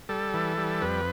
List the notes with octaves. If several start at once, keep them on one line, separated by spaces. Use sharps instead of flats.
G3 A4
E3
G3
F2 B4